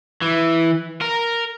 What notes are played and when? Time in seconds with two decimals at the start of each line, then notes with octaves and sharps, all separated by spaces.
0.22 E3
1.01 A#4